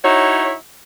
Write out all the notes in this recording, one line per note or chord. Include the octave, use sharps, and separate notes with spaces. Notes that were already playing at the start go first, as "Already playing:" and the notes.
D#4 E4 F#4 C#5